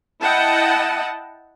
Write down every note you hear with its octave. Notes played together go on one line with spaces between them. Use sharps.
E4 D#5 F#5 G5 A5